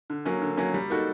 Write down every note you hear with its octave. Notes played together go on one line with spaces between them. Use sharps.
D3
F#3 A#3 C#4
D3
F#3 A#3 C#4
G3
A#3 D#4 F#4 A4